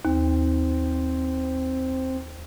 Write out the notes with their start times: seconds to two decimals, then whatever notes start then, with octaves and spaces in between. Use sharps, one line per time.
0.05 D#2 C4